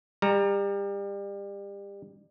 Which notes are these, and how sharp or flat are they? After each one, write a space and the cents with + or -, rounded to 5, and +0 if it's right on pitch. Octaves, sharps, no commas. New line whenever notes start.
G3 +30 A#5 +5